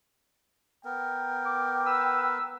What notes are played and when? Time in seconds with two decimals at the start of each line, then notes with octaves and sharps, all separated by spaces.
0.85 B3 A#4 G5
1.45 D6
1.86 B4 E6